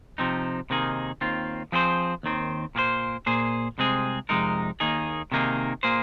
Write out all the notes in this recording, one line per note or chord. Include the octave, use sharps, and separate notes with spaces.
C3 F3 C4 D#4
C3 D#3 A#3 D#4 G#4
D#2 D#3 C4 F4
F3 C4 G#4 C5
D#2 D#3 C4
A#2 A#3 G#4 C5
A#2 A#3 G#4 C5
C2 C3 G#3 C4 G#4
F2 C3 G#3 D#4 A#4
D#2 D#3 A#3 D#4 G#4
C3 D#3 A#3 D#4 G#4
A#2 A#3 G#4 C5